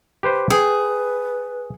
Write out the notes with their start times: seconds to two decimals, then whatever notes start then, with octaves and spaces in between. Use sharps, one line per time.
0.23 G4 B4 C5
0.50 G#4 B4 G5